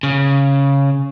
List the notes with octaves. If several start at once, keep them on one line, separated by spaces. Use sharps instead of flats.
C#3